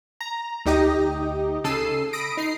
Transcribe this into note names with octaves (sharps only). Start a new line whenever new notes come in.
A#5
D2 D#4 G4 D#5
C#3 A4 E6 C7 D#7
B5 D#6 A#6 D7
D#4 C7